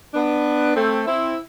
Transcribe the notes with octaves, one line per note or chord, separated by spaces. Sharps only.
B3 D4
A3 C4
C4 E4